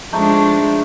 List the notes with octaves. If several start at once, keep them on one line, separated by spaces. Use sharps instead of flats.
F3 G#3 A3 D4 D#4